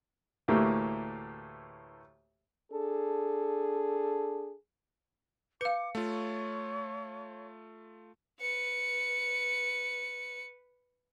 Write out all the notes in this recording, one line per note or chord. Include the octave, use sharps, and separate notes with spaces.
D2 A2 E3 A3 A#3 G4
D4 G#4 A4
B4 F5 D6 C#7
A3 F4 C#5
B4 C#7